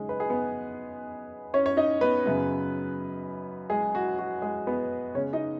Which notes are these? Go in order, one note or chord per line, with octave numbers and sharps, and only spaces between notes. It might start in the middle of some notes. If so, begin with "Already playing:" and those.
Already playing: C#3 F#3 G#3 D#4 G#4
B4
G#4
B3 B4
C#4 C#5
C#5
D#4 D#5
B3 B4
F#2 C#3 B3
G#3 G#4
F#4
F#4
G#3 G#4
B3 B4
C#3 G#3 B3 C#4 C#5
D#4 D#5